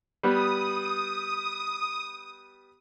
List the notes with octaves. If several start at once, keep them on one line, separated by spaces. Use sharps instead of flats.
G3 B3 D#6